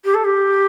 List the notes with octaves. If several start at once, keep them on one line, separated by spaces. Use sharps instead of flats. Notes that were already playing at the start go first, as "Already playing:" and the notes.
G4
A4
G4